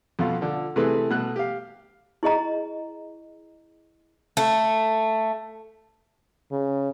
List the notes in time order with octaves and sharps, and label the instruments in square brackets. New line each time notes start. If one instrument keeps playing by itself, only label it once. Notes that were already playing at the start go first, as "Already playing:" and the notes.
[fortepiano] F2 B2 F4
D3 F3
C3 E3 A3 G#4 A4 B4
B2 A3 F#6
G4 F5
[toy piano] E4 G#4 D#5 A#5
[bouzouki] A3
[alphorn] C#3